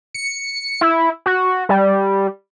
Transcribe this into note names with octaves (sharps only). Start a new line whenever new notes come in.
C#7
E4
F#4
G3